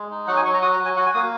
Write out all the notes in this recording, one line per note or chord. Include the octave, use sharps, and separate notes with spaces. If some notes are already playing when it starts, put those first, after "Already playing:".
Already playing: G#3
D#4
F#3 F#5
G#5
F#3 C#6
A#5
F#4 D#6
A#5
F#3
G#5
F#4 F#5
G#5
A#3 D#6